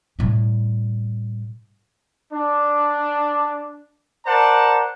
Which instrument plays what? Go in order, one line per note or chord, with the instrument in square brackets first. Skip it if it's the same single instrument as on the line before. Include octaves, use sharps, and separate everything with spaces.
[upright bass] A2 G3
[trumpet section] D4
A#4 C5 D5 F#5 A5